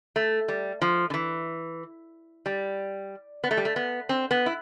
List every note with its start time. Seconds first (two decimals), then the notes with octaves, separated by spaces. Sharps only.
0.16 A3
0.48 G3
0.82 F3
1.10 D3
1.14 E3
2.46 G3
3.44 B3
3.51 A3
3.57 G3
3.65 A3
3.76 B3
4.09 C4
4.31 B3
4.46 E4